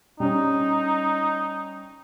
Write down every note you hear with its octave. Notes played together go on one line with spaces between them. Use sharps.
G3 C#4 D#4